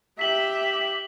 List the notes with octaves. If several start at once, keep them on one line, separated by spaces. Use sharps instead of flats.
G4 E5 B6 F#7 G7